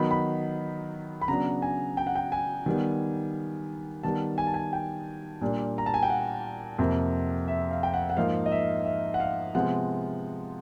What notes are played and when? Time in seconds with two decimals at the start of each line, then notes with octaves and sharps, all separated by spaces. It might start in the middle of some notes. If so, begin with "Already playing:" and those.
Already playing: D#3 F#3 B3 D#4 B5
0.11 B5
1.21 B5
1.28 C#3 F#3 B3 D4 A#5
1.62 G#5
1.97 G5
2.07 F#5
2.15 G5
2.32 G#5
2.66 D#3 G3 B3
4.03 D#3 G3 B3 A5
4.38 G#5
4.47 A5
4.54 G#5
4.73 G5
5.41 A#2 G3 A#3 D4
5.78 A#5
5.86 A5
5.94 G#5
6.03 G5
6.10 F#5
6.79 F2 C3 F3 A#3
7.48 E5
7.71 F5
7.83 G5
7.94 F#5
8.10 F#5
8.17 G#2 F3 A#3 D#4 F5
8.46 D#5
8.52 E5
8.85 E5
9.14 F#5
9.20 F5
9.55 C3 F3 G#3 B3 F#5